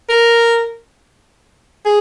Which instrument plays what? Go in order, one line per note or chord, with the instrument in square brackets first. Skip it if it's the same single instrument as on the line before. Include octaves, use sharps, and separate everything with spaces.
[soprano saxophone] A#4
G#4